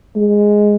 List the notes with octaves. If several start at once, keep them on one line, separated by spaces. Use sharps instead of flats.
G#3